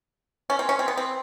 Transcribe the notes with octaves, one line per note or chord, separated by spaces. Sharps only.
C#4
C4
C#4
C4
B3
C4